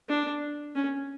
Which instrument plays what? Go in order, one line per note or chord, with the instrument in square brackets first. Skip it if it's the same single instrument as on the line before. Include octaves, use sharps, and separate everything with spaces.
[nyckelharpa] D4
C#4